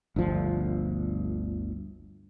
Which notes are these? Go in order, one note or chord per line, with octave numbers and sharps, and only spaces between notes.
G1 D2 F3